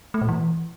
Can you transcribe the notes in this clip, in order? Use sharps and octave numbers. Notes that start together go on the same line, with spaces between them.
A3
A#2
E3